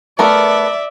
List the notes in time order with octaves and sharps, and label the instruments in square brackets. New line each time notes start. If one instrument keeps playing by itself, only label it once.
[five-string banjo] A3 B3 A#4 [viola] D5 E5